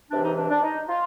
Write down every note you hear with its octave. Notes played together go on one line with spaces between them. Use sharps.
C#2 C3 E3 D4
D#4
D4
D4
D#4
F4